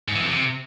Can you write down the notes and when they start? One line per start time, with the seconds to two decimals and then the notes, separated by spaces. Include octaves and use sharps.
0.08 G#2
0.15 E3
0.22 F2
0.29 C3